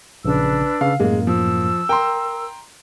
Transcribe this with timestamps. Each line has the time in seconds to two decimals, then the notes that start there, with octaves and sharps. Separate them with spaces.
0.25 A#1 C#3 D4 B4 E6
0.81 C#3 F5
1.00 F#2 A2 G#3 A#3
1.27 F3 E6
1.89 A#4 G5 A#5 C6